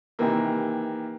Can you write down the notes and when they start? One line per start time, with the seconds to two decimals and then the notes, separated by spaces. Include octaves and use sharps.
0.19 C3 D#3 E3 A#3